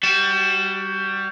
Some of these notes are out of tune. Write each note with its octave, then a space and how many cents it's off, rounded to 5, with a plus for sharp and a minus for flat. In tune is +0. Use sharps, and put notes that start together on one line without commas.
G3 +0 F#4 +25